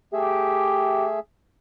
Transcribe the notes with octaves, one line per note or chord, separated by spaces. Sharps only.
A3 G4 G#4 E5